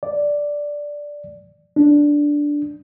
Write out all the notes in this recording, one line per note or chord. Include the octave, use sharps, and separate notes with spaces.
D5
D4